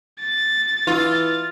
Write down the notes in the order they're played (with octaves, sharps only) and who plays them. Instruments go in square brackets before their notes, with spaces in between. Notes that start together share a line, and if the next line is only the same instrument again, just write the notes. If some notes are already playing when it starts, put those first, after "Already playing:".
[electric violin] A6
[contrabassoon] E3 [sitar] F4